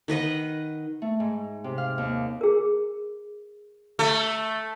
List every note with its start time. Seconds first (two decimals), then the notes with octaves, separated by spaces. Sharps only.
0.08 D#3 B4 D#5 F#5
1.02 A3
1.20 G#2
1.64 C3
1.78 F5
1.98 D#2
2.41 G#4 A#4
3.99 A3